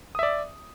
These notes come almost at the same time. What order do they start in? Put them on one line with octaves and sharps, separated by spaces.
D#6 E5 D5